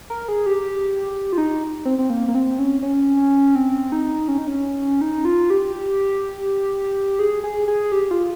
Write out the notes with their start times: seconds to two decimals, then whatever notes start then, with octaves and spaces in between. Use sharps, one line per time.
0.10 A#4
0.28 G#4
0.46 G4
1.33 F4
1.38 D#4
1.85 C4
1.99 C4
2.10 A#3
2.28 A#3
2.35 C4
2.59 C#4
2.82 C#4
3.55 C4
3.92 D#4
4.28 C#4
4.38 D#4
4.47 C#4
5.01 D#4
5.25 F4
5.50 G4
7.19 G#4
7.44 G#4
7.68 G#4
7.92 G4
8.11 F4